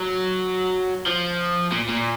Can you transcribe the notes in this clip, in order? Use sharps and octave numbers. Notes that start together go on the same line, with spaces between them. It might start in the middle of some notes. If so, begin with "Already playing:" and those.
Already playing: F#3
F3
A#2
A#2